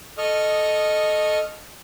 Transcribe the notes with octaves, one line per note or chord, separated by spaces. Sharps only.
A4 D#5 C#6 D#6 F6